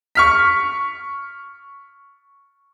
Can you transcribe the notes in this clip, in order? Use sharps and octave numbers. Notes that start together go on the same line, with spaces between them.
C#6 F6 B6